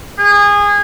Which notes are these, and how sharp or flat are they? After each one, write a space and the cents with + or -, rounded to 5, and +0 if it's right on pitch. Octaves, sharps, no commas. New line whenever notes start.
G#4 -25